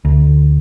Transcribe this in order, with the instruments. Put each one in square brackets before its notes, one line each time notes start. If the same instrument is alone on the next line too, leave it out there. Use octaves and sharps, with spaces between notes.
[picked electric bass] D2